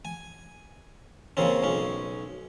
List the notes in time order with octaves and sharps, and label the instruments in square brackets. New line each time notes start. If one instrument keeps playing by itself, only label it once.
[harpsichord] G#5
A#2 C#3 C4 C#4
B1 C#4